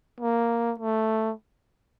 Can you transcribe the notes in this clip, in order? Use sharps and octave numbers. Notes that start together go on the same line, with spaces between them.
A#3
A3